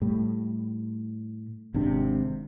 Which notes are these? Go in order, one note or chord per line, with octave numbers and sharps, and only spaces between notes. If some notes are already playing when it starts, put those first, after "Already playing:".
A2 G3
G#1 C3 D4